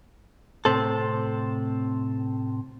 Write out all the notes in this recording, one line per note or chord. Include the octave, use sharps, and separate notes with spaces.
A2 C3 C4 A4